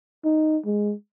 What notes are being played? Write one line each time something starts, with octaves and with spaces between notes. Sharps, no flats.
D#4
G#3